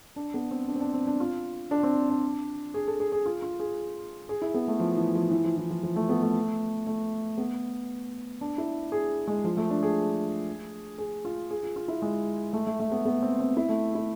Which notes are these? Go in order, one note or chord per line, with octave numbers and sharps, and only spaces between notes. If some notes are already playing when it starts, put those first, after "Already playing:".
D4
B3
C4
D4
C4
D4
C4
D4
F4
D4
C4
D4
G#4
A4
G#4
G#4
F4
F4
G#4
G#4
E4
B3
A3
F3
E3
F3
E3
F3
E3
F3
F3
A3
B3
A3
A3
B3
D4
E4
G#4
G#3
F3
A3
D4
G#4
G#4
F4
G#4
F4
F4
E4
G#3
A3
A3
A3
B3
B3
C4
C4
E4
A3
E4